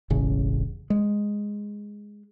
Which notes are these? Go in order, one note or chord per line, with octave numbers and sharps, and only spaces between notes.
E1 A1 C#3
G#3